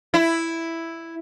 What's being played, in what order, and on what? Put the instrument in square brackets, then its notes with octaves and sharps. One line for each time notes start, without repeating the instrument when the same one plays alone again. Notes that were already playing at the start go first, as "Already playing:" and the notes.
[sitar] E4